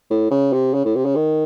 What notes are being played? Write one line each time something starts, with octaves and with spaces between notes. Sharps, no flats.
A2
C#3
C3
C#3
A2
C3
C#3
D#3